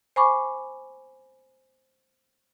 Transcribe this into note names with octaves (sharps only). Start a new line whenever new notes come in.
C5 G#5 B5 C#6 D6